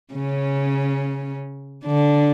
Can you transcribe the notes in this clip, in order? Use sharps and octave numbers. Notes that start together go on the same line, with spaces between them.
C#3 C#4
D3 D4